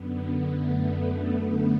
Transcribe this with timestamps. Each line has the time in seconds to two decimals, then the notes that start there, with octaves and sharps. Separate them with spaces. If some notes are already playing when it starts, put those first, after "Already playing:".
Already playing: F#2 D3 B3
0.53 A3